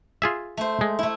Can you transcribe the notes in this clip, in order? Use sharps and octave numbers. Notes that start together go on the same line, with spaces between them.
F4 G#4 E5
A3 C5
G#3
A3 E4